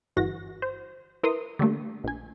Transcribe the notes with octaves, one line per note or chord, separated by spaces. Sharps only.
G1 E3 F#4 A#6
C5
E4 A#4 B4 C6 D#6
D3 G3 A3 A#3
A#1 G#5